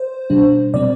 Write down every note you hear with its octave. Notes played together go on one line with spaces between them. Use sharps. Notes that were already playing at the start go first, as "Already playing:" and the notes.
Already playing: C5
B2 G3 D4
B2 G3 C4 D5